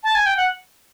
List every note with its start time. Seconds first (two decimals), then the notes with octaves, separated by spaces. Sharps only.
0.04 A5
0.15 G#5
0.26 G5
0.37 F#5